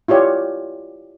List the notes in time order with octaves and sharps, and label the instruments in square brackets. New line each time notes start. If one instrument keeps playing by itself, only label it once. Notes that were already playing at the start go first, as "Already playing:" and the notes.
[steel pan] E4 F4 G4 C#5 D5